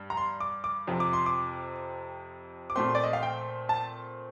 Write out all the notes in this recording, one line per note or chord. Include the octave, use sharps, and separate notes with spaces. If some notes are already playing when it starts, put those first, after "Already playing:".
Already playing: G2
A#5
C6
D6
D6
F2 C3 F3
D6
C6
D6
D6
A#2 A3 C4 C6
D5
D#5
F5
G5
A5